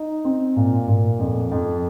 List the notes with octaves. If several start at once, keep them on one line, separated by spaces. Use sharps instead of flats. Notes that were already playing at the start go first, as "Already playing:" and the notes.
Already playing: D#4
C4
A#2
A#2
F2
F2